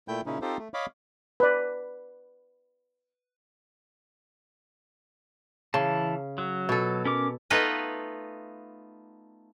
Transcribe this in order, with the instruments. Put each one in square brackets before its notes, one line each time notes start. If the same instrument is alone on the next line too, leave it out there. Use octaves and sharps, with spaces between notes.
[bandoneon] A#2 A3 E4 G5 G6
A#2 C#3 C#4 D#4 E4
C4 D#4 F4 G4 A4 C5
A3
C#5 D#5 F5 B5 D6
[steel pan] B4 D5
[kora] C#3 [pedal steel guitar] E3 A5
[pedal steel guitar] F#3
[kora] B2 A4
[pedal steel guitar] C#4 A#4 D6
[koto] A3 B3 D#4 F4 B4 D#5